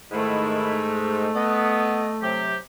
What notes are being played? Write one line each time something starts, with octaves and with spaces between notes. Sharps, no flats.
G#2 D#3 A3 E4
B3 D#5
C3 F#3 G4